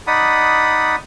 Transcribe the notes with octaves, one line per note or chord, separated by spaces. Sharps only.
D#4 D5 F#5 B5 D#6